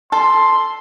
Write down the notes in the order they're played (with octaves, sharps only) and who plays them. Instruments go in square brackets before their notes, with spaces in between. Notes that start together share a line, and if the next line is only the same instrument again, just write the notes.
[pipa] A4 [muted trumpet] C6